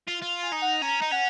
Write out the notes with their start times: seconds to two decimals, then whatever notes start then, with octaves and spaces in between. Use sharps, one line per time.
0.08 F4
0.22 F4
0.43 G#5
0.52 D#4
0.62 F#5
0.82 C#4 A#5
1.02 D#4
1.12 C#4 F#5